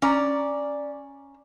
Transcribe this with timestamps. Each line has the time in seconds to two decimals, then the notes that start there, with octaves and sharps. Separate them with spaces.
0.02 C#4 D5 A#5